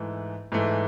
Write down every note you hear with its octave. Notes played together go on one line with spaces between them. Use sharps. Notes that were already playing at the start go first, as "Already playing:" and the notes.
Already playing: G#2 E3 A3
G#2 E3 A3